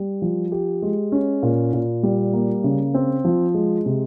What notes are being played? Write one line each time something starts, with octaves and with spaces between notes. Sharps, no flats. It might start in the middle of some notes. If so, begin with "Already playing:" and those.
Already playing: G3
F3
G4
G#3
C#4
A#2
A#2
G3
A#3
C#3
C4
F3
G#3
C3